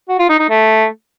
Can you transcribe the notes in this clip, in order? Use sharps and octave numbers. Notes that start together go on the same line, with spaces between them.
F#4
F4
D#4
D#4
A3